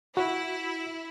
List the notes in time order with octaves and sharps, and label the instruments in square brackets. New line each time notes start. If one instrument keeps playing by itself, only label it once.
[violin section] E4 [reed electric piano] F#4